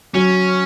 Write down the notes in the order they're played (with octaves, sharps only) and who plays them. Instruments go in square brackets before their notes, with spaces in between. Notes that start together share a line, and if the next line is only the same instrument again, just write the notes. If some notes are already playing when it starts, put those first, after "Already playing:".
[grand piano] F#3 [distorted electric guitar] C#4